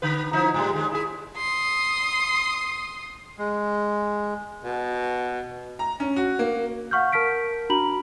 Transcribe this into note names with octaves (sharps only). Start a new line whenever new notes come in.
D3 B4
F3 D#4 E4
A2 G3 G#3
D#2 G#3
E4 G#4
C6 D#6
G#3
B2
A#5
C#4
F#4
A#3
F5 F#5 C#6 F6 G6
A#4 A5 F6 B6 D7
D4 F#4 A#5 B5 F#7